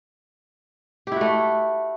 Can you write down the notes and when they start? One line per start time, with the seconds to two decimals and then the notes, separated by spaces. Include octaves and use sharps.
1.07 G4
1.12 E4
1.16 F#4
1.21 A3